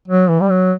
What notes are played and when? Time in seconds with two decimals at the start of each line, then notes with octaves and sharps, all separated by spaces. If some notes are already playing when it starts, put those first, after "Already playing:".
0.08 F#3
0.29 E3
0.41 G3
0.50 F#3